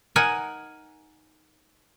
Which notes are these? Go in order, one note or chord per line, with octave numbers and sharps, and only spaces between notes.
D#4 A#4 F#5 G#5